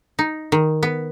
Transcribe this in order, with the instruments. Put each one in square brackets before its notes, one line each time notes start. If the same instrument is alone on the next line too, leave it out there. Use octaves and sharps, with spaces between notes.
[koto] D#4
D#3
B3